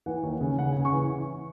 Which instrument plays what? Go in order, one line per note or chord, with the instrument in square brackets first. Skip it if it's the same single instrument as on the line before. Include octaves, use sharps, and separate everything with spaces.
[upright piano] E3 F#5
D#2
C#3
C#3 F#5
C#3 G#5
C#6
E3